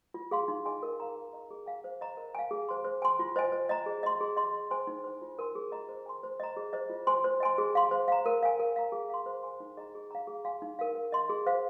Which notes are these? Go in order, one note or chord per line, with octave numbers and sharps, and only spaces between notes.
F4
G#4 F5 C6
D#4
G#4 D#5 G#5 C6
A#4
F5 A#5
A#4
D#5 A#5
G#4
F5 G#5
C5
D#5 A#5
A#4
F5 G#5
G#4
C5 G#5 C6
C5
G#5 C6
F4
C5 D#5 G#5
C5
D#5 A#5
G#4
D#5 C6
G#4
D#5 C6
G#4
C5 G#5 C6
D#4
C5 G#5
F4
A#4 G#5 C6
G#4
D#5 A#5
C5
G#5 C6
C5
D#5 A#5
G#4
C5 D#5
F4
C5 G#5 C6
C5
D#5 G#5 C6
G#4
F5 C6
C5
F5 A#5
A#4
F5 G#5
A#4
F5 A#5
G#4
F5 C6
C5
G#5 C6
D#4
G#4 D#5 A#5
G#4
F5 A#5
G#4
F5 G#5 C6
D#4
A#4 F5
A#4
D#5 C6
G#4
C5 F5